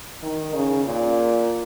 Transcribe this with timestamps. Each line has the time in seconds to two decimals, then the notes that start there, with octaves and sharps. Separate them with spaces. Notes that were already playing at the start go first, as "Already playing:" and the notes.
0.23 D#3
0.54 C#3
0.85 A#2